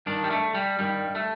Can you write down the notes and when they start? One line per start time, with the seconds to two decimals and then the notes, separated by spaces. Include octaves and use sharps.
0.06 G2 D#3 D4
0.24 G3
0.30 A3
0.55 G3
0.79 G2 D#3 G3
1.15 A3